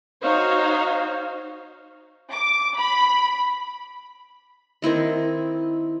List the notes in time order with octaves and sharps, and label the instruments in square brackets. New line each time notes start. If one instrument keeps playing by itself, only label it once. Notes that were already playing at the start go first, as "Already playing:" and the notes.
[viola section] D#4 F#4 C5 C#5 F5
[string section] D6
B5
[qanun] D#3 C4 E4 D#5